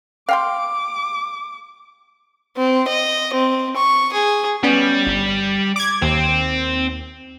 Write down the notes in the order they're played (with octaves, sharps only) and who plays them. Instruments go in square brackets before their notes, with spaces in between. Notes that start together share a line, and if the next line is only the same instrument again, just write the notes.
[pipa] F5 G5 C6 [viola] D6
[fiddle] C4
D#5
C4
C#6
G#4
[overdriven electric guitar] G3 [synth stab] B3 C#4
[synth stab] G1
D6 G#6
[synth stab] D#2 [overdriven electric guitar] C4